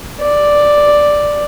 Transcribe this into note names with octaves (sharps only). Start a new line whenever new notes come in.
D5